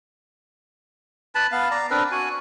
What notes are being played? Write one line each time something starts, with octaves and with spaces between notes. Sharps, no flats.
B4 A5 B5
B3 F5
D5 A#5
C4 D4 A#4 B4
F#4 G#5